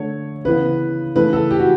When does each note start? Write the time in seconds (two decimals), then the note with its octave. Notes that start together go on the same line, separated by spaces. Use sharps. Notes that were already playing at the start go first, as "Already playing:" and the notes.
Already playing: D3 A3 C#5
0.45 C#3 E3 B3 B4
1.15 C#3 E3 A3 B4
1.33 A4
1.51 G4
1.59 F#4